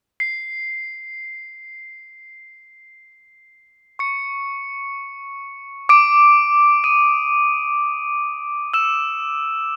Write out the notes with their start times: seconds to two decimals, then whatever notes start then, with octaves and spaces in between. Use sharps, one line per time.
0.20 C7
3.99 C#6 C#7
5.89 D6 D7
6.84 D#6 D#7
8.74 E6 E7